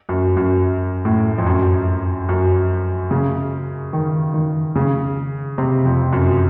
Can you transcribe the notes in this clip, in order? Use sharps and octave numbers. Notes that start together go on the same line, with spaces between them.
F#2
F#2
A2
F2
F#2
F#2
C#3
D#3
D#3
C#3
C3
F2
F#2